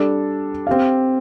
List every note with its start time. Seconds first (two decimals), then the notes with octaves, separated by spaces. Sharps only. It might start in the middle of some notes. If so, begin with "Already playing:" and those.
Already playing: G3 D4 A4 D5
0.67 C4 G4 F5